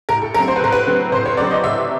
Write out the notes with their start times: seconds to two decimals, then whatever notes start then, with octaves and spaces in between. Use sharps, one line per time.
0.09 A2 A#4
0.22 A4
0.34 F#3 A#4
0.37 A3 C4
0.48 C5
0.56 B4
0.61 A2 A#4
0.72 B4
0.86 F#3 A3 C4
1.12 A2 C5
1.25 C#5
1.37 F#3 A3 C4 D5
1.51 D#5
1.64 A2 E5